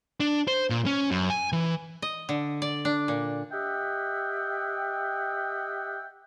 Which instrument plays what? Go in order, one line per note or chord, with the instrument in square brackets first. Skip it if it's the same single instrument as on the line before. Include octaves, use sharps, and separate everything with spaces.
[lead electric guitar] D4
C5
A#2
C#4
F#2
G#5
E3
[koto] D#5
D3
D5
D4
A#2
[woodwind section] G4 D#5 E5 F#5 G5